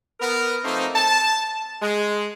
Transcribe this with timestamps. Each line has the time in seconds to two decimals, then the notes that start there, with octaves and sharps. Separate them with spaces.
0.20 B3 A#4
0.64 F3 A3 A#3 C4 D#4
0.95 A5
1.81 G#3